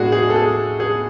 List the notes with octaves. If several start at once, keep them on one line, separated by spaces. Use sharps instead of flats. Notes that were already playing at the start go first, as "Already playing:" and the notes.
Already playing: A2 G#3 D4 F#4 G#4
G#4
A4
G#4
G#4